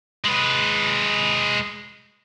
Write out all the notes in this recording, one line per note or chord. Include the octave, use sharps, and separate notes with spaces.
G#3 B4